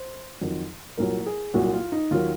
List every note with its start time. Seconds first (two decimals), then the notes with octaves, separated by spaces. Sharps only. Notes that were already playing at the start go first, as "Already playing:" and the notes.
Already playing: C5
0.41 F2 D#3 F#3
0.97 C2 A#2 F#3 A#4
1.26 G#4
1.54 C2 A#2 F#3 F#4
1.73 F4
1.92 D#4
2.11 D#2 D#3 F#3 F4